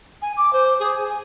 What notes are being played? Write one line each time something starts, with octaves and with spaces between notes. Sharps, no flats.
G#5
D6
C5
G#4
G#5
G#5